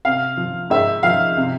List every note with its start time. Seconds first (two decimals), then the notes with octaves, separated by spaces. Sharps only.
0.05 C3 F5
0.37 F3
0.70 G#2 E5
1.03 F3 F5
1.37 C3